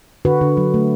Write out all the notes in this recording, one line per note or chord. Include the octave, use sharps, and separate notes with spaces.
D3 F#4 B4
D3
F#3
A3